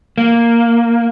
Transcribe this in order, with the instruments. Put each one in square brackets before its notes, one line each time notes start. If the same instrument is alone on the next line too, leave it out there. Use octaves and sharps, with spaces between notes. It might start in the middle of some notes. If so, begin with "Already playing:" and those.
[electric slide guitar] A#3